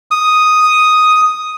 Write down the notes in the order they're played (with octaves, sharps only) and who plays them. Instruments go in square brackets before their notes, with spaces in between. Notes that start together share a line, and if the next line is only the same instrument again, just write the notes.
[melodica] D#6